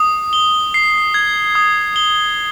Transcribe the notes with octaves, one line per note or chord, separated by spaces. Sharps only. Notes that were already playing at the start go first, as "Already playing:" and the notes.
Already playing: D#6
G7
C7
G#6
D#6
G7